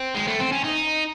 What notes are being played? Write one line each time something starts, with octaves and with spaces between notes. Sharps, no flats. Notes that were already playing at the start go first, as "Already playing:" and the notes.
Already playing: C4
G#3
A3
C4
C#4
D#4